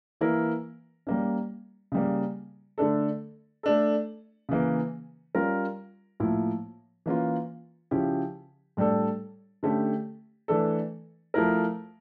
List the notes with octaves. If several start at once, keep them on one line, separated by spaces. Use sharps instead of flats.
E3 A#3 E4 A#4
G3 A#3 C#4
C#3 G3 A#3
D3 A3 D4 A4
A3 D4 A4
C#3 E3 A#3
G3 C#4 F4 A#4
A2 F3 A#3 E4
E3 A#3 C#4 F4
C#3 F3 C#4 E4 G4
A2 G3 D4 A4
D3 A3 C#4 G4
E3 A3 D4 A4
F3 A3 E4 A#4